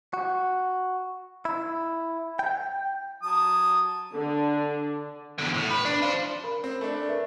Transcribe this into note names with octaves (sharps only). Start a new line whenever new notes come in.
F#4
E4
G5
F#3 A5 D#6
D3 D4
E2 D3
A2
B4
D4
F4 C5
A#4 B5
C4
A3 D4
A#4 B4 E5